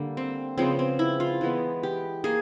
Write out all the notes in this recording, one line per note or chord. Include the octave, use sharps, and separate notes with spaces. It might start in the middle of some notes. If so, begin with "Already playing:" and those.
Already playing: D3 G3 A#3
C4
C#3 F3 G#3 B3 C4
C4
E4
F4
E3 G#3 B3
G4
A#3 G#4